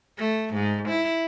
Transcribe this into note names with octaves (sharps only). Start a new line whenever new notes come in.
A3
G#2
E4